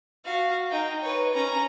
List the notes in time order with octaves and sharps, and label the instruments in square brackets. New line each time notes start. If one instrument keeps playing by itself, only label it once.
[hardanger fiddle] F#4 F5
D#4 G5
B4 C#5
C#4 A#5